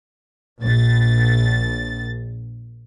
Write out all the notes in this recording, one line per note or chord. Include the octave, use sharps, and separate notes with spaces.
A#1 A6